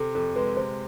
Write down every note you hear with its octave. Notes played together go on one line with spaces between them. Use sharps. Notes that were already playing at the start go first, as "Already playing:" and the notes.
Already playing: C3 A4
F2 A4
G#3 B4
C3 C5